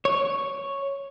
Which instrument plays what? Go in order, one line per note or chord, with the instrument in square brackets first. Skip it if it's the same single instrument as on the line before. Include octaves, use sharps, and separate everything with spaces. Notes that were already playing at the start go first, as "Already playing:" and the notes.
[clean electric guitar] C#5